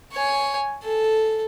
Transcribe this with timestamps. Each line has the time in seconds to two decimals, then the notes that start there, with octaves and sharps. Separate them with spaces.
0.14 C#5 G#5
0.83 A4